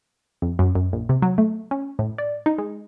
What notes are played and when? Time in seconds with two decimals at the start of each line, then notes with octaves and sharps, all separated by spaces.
0.42 F2
0.59 F#2
0.75 F#2
0.93 A#1
1.09 C3
1.22 F#3
1.38 A3
1.71 C#4
1.99 A2
2.18 D5
2.46 D#4
2.58 G#3